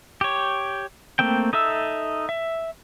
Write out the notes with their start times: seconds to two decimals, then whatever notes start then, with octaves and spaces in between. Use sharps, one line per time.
0.21 G4 C#5
1.19 A3 A#3 C4 G5
1.53 D#4 A4 E5 E6
2.29 E5